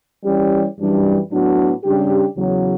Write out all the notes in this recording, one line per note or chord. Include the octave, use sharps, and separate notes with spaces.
E3 G3 C#4 G4
F#2 E3 G3 D4
A2 F#3 B3 D4 F#4
C#3 G3 D4 G4
E2 C#3 F#3